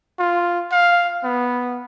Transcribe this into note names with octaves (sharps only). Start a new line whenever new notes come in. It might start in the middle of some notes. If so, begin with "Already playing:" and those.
F4
F5
B3